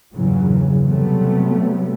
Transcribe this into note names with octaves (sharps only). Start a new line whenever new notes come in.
E2 G2 A#2 C#3 E3 F#3
C3 F#3 G3 A3 B3